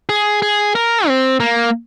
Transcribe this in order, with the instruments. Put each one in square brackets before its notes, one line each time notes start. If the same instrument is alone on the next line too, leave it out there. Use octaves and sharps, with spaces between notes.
[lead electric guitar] G#4
G#4
A#4
C4
A#3